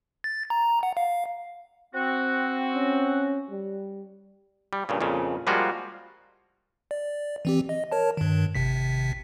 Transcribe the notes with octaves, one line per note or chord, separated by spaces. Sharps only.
A6
A#5
F#5
F5
C4 F#4
C#4
G3
G3
G2 A#2 C#3
F2 A#2 C#3
F3 G3 G#3 A#3 F4 F#4
D5
E3 C4 G4
D#5
A#4 C#5 A5
G2 D#3
G#1 C3 B6